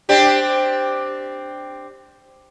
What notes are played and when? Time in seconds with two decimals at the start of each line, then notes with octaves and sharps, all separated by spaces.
0.09 C4 D4 G4